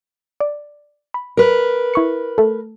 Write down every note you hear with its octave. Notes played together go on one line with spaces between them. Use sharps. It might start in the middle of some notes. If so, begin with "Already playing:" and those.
D5
B5
A#4 B4
E4 C#6 C#7
A3 A4